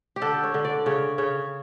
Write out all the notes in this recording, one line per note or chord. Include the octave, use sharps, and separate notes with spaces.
G4
D3 A4
C#5
D3
D5
C#3 C#5
C#3 C#5